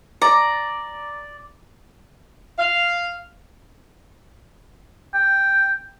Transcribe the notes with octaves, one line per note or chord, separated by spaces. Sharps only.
D5 A#5
F5
G5